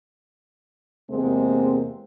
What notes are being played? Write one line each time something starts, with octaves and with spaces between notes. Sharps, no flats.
E2 C3 G#3 A#3 C4